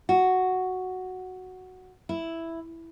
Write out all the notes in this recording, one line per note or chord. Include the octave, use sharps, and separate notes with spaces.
F#4
E4